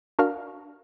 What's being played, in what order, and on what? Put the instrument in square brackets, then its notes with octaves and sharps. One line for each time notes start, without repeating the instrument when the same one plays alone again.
[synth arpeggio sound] D4 F#4 A#4 F5 F6